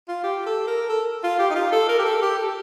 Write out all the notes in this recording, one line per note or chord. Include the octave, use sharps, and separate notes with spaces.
F4
G4
A4
A#4
A4
F4
G4
D#4
F4
A4
A#4
G4
A4
G4
A4